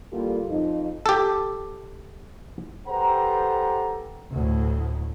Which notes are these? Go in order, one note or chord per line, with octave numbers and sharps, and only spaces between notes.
D3 G3 A#3 F4 G4 A4
F2 D#4
G4 A4
G4 A4 B4 C5 F#5 A#5
D2 A2